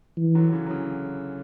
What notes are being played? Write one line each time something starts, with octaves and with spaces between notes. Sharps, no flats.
E3
D3 F#3
F#3
C#3 E3
F#3
C#3 E3